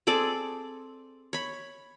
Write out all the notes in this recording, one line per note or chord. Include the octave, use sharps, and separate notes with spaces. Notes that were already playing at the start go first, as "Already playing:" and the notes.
C4 G#4 A4 D5
C#5 B5